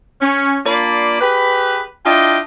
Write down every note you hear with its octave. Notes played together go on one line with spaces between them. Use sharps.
C#4
A#3 D4 F4 D5 B5
G4 G#4 B4
D4 E4 F4 D#5 G5